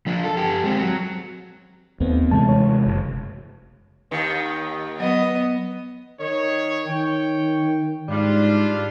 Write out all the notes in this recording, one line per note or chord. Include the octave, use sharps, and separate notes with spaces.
F3 D4
A4
G4 A4
G#3 C4
F#3
D#2 A3 B3 C4
C3 E3 G#3 A3 A5
C#5
F#1
D#2 D#3
F#3 B3 D#5
D#3 C#5
D#3 C#5 G5
G#2 G3 D4 F4